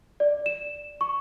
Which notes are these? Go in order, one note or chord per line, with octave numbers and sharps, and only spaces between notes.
D5
E7
C#6